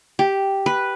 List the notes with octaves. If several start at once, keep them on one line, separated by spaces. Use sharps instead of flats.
G4
B4